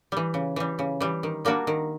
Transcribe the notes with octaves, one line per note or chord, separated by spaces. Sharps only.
E3 G3
C#3
E3 G3
C#3
E3 G3
D#3
G3 A#3 D4 F#4
D#3